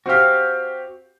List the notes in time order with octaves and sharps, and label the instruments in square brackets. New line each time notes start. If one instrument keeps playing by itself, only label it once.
[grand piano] C4 G4 [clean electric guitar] F#4 F5